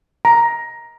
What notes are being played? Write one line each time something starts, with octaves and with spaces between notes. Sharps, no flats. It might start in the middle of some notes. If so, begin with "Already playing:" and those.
A#5